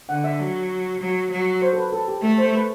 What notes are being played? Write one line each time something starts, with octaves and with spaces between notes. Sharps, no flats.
D3 F#5
E5
F#3
F#3
F#3
C5
A4
B4
A4
G4
A3 A4
C5
B4